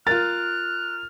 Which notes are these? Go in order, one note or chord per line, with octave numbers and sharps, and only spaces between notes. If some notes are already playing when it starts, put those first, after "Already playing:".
F4 A#4 F6 F#6 A6